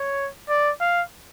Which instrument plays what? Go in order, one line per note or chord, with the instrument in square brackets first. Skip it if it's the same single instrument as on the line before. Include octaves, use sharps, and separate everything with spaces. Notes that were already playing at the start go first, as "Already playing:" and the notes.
Already playing: [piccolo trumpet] C#5
D5
F5